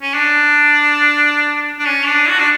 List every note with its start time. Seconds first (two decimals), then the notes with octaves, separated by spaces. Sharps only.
0.02 C#4
0.14 D4
1.79 D4
1.86 C#4
2.07 D4
2.29 F#4
2.39 D4